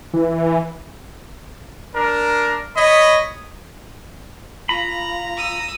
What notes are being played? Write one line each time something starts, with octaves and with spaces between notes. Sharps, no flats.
E3
D4 A#4
C#5 D#5 B5
F4 A#5 B5
D#6 E6